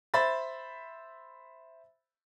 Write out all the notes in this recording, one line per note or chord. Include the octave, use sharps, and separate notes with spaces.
C5 E5 B5 A6